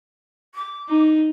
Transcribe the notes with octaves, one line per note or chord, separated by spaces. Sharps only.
D6
D#4